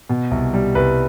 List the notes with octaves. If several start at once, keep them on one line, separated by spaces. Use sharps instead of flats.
B2
C2
G3
C2 B4